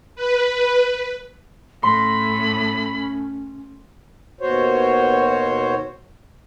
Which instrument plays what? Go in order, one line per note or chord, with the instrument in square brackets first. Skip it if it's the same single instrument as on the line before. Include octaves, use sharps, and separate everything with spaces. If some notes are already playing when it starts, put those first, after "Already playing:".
[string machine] B4
[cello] A2 [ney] C#4 [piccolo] B5 [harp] C6
[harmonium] D#2 B2 F#4 C5 C#5